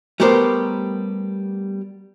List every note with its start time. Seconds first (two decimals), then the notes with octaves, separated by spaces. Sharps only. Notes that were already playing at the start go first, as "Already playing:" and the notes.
0.20 G3 A3 B3 G4 A#4 C5